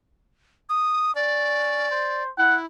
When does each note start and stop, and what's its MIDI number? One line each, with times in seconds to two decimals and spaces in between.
0.69 1.15 87
1.15 1.90 61
1.15 2.23 74
1.91 2.30 72
2.38 2.65 64
2.38 2.56 78